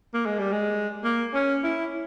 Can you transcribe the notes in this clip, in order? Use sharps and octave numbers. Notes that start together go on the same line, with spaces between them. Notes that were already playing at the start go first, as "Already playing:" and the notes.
A#3
G#3
G3
G#3
A#3
C#4
E4